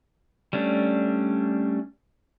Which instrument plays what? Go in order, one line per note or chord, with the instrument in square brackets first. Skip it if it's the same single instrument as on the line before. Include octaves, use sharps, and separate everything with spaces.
[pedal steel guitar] G3 A3 C#4 D4